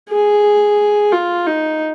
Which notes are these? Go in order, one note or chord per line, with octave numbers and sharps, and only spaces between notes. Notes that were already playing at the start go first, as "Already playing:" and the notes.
G#4
F4
D#4